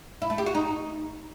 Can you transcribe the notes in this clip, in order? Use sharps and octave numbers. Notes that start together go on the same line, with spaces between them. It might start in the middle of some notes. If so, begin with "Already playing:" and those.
E4
A3
G4
F#4
D#4